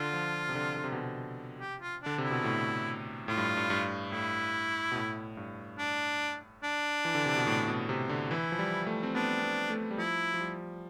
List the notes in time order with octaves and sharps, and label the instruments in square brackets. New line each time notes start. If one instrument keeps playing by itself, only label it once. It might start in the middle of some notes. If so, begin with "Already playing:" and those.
Already playing: [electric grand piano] D3 [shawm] F4
[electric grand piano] F3
C3
D3
D3
C3
B2
C3
[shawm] G4
F4
[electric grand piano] D3 [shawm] D4
[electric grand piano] C3 [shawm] E4
[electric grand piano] B2
A2
[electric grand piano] A2 [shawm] F4
[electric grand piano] G2
G2
G2
[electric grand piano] A2 [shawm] E4
[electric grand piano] B2
A2
G2
[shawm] D4
D4
[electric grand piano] E3
D3
C3
B2
A2
B2
C3
D3
[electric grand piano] E3 [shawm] E4
[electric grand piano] F3
G3
A3
C4
[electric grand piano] B3 [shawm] D4
[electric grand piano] B3
A3
G3
[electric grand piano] F3 [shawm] E4
[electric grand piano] F3
G3